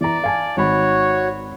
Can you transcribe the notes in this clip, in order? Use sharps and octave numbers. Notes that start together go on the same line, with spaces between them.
E3 D5 A#5
F5 G#5 A5
G#1 D#4 F#4 C#5 B5